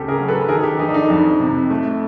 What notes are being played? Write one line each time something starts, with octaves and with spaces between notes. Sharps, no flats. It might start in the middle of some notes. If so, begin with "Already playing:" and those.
Already playing: D2 C#3 G4 A4
G#4 A#4
F#3
A4 B4
D#3 G#4 A#4
G4 A4
F1 D#4
D4
D#4
F2 D#4
C3
A3